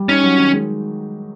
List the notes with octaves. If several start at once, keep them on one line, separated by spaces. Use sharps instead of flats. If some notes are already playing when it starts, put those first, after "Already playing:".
Already playing: G3
C#4 D#4
F#3
D#3
G#3